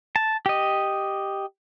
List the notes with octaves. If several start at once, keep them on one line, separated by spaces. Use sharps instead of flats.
A5
G4 D#5